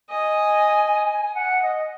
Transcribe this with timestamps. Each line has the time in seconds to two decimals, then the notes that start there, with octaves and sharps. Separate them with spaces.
0.10 D#5 G#5
1.34 F#5
1.62 D#5